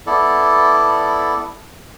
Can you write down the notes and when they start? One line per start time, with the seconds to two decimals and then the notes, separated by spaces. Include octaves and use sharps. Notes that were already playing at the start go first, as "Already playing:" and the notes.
0.07 B3 E4 A4 D5